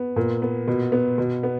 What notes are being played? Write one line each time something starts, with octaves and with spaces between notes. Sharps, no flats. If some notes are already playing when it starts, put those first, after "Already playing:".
Already playing: B3
A#2
B3
B2
B3
B2
B3